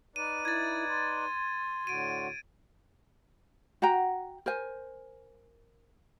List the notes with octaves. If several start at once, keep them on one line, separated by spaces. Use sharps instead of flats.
D#4 B4 D5 D#7
E4 G#6 A6
C6
A2 D3 F#4 D7 D#7
F#4 F#5 G5 A#5
A#4 C5 G#5